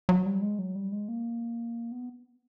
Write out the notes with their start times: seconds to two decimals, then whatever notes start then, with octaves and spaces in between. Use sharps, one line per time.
0.09 F#3
0.26 G3
0.42 G#3
0.59 F#3
0.75 G3
0.92 G#3
1.08 A#3
1.92 B3